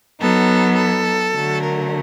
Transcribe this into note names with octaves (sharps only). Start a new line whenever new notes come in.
F#3 B3 D#4 A4
A4
D3 F#3 A3
A#4